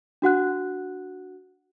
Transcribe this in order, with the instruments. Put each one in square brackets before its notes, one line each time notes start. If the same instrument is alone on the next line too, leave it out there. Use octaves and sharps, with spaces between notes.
[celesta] D4 F#4 F#5 F#6